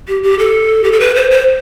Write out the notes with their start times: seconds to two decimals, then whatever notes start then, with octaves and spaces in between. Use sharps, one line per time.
0.08 G4
0.23 G4
0.39 A4
0.84 G4
0.92 A4
1.00 B4
1.15 C5
1.31 C5